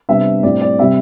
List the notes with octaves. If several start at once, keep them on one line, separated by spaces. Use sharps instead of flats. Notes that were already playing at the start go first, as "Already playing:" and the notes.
C3 G3 B3 D4 E5
A2 G3 C4 D5
D5
C3 G3 C4 E5